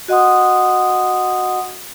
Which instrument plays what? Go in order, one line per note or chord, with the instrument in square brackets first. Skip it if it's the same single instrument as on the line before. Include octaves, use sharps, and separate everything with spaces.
[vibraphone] F#4 D#5 F#5 C6 D#6